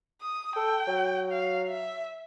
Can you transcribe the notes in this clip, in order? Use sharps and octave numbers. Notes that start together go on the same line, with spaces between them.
D#6
A4 G5
F#3
F5
E5